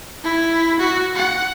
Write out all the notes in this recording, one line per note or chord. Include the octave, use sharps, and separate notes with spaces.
E4
F#4
F#5